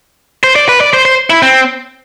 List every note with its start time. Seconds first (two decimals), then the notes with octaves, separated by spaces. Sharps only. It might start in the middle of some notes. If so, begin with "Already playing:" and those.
0.44 C5
0.56 D5
0.69 B4
0.81 D5
0.93 C5
1.05 C5
1.30 E4
1.43 C4